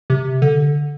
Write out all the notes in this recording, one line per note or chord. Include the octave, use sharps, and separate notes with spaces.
C3
D3